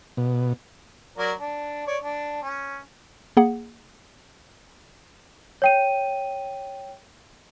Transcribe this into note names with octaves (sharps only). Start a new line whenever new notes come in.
B2
F#3 A#4 D5
D4
C#5 D5
D4
C#4
A#3 G#4 F#5
C#5 G5 D#7